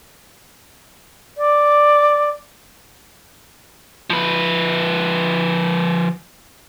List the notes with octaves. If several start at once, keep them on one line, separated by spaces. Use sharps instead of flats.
D5
F3 B4